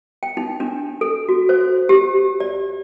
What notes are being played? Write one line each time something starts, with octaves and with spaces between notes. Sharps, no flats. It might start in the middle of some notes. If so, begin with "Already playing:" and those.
G5
D#4
D4
A4
F#4
C5
G4
D5